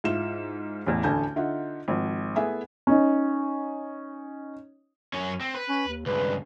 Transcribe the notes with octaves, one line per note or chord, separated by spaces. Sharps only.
G#2 E4 F4 E7
A1 E2
A1 D2 D3 G#5 A5 G6
D3 D#4 F4 E5 F#5
G#1 F3
A3 B3 E4 G#4 E5 G#5
C#4 D#4
F#2 C#4
C4
B4
C#4
D#2
C#2 G2 B4